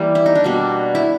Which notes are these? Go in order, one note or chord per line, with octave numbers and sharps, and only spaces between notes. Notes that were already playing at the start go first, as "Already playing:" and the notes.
Already playing: E3 G3 A#3
E4
D#4
D4
B2 G3 A#3
E4